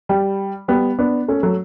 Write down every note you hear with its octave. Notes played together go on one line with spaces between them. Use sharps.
G3
G3 B3
B3 D4
A3 C#4
F#3 A3